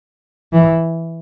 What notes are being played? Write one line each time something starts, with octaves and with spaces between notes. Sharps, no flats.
E3